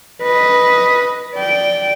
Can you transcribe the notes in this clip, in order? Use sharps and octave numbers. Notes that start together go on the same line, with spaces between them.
B4 D#5
D5 G5